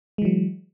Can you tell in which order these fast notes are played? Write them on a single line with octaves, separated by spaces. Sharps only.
G#3 E3 F#3